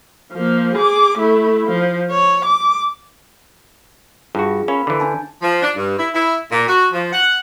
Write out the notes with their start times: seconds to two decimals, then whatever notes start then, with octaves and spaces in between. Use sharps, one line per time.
0.33 F3 A#3
0.74 G#4 D6
1.18 A3 E4
1.68 F3
2.12 C#5
2.45 D6
4.35 G2 F4 F#4 G#4
4.68 C#4 A#4 F5 B5
4.87 D3 E3
5.00 D4 G#5 A5
5.42 F3
5.62 D4
5.76 G2
5.99 E4
6.14 E4
6.52 A#2
6.68 F#4
6.92 F3
7.13 F#5